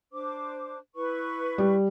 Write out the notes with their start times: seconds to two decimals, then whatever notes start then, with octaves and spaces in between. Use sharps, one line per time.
0.12 D4 C5 D6
0.95 E4 B4 C#6
1.58 G3